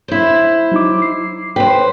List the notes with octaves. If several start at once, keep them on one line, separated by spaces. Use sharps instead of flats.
E4 C5
F#3 D#4 D6
C7
B4 C5 G5